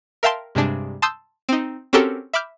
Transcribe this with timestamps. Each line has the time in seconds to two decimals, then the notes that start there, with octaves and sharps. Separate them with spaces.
0.23 A#4 E5 F5 G5 A5 C6
0.55 G2 C3 G#3 D4
1.02 A5 C6 D#6 E6 G6
1.49 C4 D#4
1.93 C4 C#4 F#4 G4 A4 A#4
2.33 E5 B5 D6 F6 G6